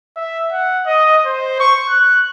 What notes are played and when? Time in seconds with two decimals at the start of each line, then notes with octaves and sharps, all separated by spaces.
0.16 E5
0.52 F#5
0.86 D#5
1.26 C5
1.60 C#6
1.89 F#6